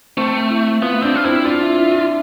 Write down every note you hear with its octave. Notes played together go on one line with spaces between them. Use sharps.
A3 C4
E4
B3 F4
C4 D4
F4
C4 E4
D4 F4
E4
E4
E4